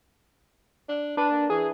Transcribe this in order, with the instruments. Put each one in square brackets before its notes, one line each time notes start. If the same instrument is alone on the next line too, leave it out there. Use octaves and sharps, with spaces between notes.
[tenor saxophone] D4
[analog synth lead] D4 [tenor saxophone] B4
[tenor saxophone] A#3
[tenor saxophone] E3 [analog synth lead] G#4